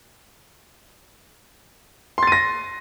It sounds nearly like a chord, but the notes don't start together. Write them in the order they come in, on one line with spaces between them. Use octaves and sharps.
C6 A6 D#7 A#6